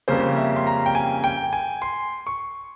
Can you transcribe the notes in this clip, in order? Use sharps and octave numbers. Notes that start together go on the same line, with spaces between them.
F2 C#3 G3 A#3 C#4 C5
E5
C6
A#5
G5
G#5
G5
G#5
C6
C#6